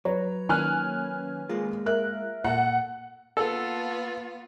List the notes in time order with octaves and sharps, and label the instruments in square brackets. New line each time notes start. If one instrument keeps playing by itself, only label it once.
[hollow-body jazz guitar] F#3 [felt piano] B4 C#5 [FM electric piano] A#5
[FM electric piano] D#3 A#3 C#4 [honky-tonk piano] G#5 F6 F#6
[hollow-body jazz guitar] G#3 A#3 F4 [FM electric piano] G#4
[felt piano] A#4 E5 F#6
[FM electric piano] A#2 [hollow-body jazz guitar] A#3 A4 [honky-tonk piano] F#5
[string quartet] A#3 B3 F4 [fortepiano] A4